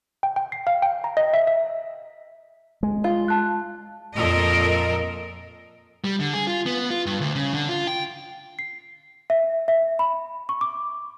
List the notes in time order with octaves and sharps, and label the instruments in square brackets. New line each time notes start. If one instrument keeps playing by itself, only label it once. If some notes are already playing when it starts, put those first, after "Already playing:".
[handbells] G5
G5
C7
F5
G5
A#5
D#5
E5
E5
[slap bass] G#3
[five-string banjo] F4
[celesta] A5 F#6
[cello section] F2 A#2 A4 A#4 D#5
[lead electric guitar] G3
D3
G#4
F4
B3
F4
G2
D2
C#3
D3
F4
G5
[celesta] C7
E5
E5
B5
C#6
D6